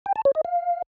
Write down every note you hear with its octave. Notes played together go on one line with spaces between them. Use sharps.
G5
A5
C#5
D#5
F5